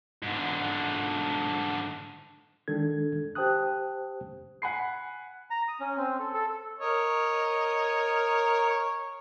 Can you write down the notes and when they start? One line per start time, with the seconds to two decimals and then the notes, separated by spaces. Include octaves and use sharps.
0.23 G#2 D3
2.68 D#3 G#3 D4 A4 G#6
3.35 G4 C5 G5 A5 D#6 F#6
4.62 F#5 G#5 B5 C7
5.50 A#5
5.68 D#6
5.80 C#4
5.97 C4
6.19 A4
6.34 A4
6.80 A#4 C#5 D#5